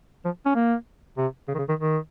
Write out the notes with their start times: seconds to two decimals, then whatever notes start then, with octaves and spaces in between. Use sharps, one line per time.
0.25 F3
0.46 C#4
0.55 A#3
1.17 C3
1.48 C#3
1.55 D#3
1.58 C#3
1.69 D#3
1.79 D#3